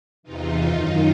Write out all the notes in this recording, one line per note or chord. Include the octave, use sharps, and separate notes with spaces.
E2 C3 E3 D#4 F4
F#2 D#3